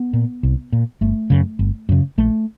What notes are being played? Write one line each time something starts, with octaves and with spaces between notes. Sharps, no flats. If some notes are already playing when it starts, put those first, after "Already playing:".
Already playing: B3
A#2
C2
A#2
G1 A3
F#2 C#3
G1
F#2 C#3
A#1 A3